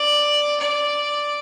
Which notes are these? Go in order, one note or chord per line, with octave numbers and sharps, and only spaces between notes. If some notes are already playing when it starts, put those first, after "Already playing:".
Already playing: D5
D5